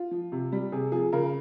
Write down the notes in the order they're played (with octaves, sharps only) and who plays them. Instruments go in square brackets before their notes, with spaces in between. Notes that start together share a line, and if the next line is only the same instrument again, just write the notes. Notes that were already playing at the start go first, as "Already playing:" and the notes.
Already playing: [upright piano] F4
F3
C3
G3
C3 G#4
F3 G#4
C#3 A#4